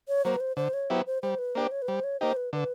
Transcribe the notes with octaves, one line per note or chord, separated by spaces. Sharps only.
C#5
F#3 A#3 C5
B4
C5
D3 C5
C#5
F#3 B3 E4 G4 C5
C5
G3 C5
B4
A#3 D4 G4 C5
C#5
B4
G3 C5
C#5
A#3 D#4 G4 C5
B4
D3 B4